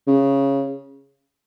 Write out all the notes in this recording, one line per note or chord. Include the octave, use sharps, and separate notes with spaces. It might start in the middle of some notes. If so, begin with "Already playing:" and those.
C#3